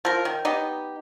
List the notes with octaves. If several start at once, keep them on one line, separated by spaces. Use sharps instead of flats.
F3 A#4
D#3
B3 D#4 G4